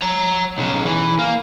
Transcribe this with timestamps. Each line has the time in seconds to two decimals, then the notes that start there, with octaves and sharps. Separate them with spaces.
0.02 C#5 A#5
0.58 B1 C#3
0.85 E3
1.19 A#3